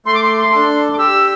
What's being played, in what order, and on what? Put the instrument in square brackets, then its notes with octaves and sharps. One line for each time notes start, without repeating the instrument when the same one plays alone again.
[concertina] A3 [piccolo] C6
[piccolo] D6
C6
C6
[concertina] D4 A4
[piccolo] D6
[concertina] G4 [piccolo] E6